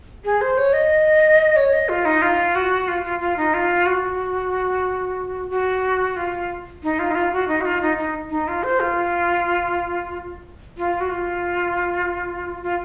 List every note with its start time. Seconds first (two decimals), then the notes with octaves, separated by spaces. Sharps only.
0.25 G#4
0.41 C5
0.58 C#5
0.73 D#5
1.56 C#5
1.73 D#5
1.89 F4
2.05 D#4
2.22 F4
2.55 F#4
2.88 F4
3.04 F4
3.20 F4
3.37 D#4
3.54 F4
3.86 F#4
5.50 F#4
6.16 F4
6.83 D#4
6.99 F4
7.10 D#4
7.15 F4
7.33 F#4
7.48 D#4
7.61 F#4
7.65 F4
7.82 D#4
7.97 D#4
8.30 D#4
8.48 F4
8.63 C5
8.80 F4
10.77 F4
11.00 F#4
11.10 F4
12.63 F4